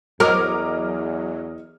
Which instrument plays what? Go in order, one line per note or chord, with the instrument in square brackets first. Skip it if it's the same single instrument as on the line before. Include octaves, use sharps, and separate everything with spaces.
[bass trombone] E2 [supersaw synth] F#3 [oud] A#4 [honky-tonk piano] D#5 D6 F6